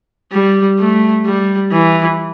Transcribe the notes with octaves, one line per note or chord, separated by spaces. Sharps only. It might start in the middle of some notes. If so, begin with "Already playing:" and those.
G3
A3
G3
E3